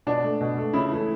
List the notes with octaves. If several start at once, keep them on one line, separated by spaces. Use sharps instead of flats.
B2 D4
A3
B2
A3
C#3 E4
E3 A3